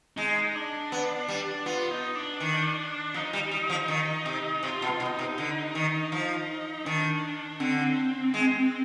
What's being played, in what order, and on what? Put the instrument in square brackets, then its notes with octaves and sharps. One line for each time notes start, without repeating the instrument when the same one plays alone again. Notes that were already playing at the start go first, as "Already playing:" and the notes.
[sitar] G#3 [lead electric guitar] D#4
[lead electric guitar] D4
[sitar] B3
G3
[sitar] B3 [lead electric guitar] F4
[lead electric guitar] D#4
D4
[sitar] D#3
[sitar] F3 [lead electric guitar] D#4
[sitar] G3
G3
F3
D#3
C3
[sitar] C3 [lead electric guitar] F4
[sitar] B2
[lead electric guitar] F4
[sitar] B2 [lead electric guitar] D#4
[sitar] C3
D3
D#3
F3
[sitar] D#3 [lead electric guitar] D4
[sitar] D3 [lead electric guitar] C4
[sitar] G#3